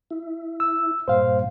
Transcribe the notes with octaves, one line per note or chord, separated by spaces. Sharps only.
E4
E6
G2 A#2 C5 F5